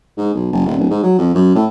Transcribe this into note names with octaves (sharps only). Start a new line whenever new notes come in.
G#2
B1
F#1
D#1
D1
G#2
F#3
F2
F#2
A2